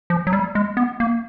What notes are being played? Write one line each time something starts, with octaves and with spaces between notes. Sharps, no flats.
F3
F#3
G3
G#3
B3
A#3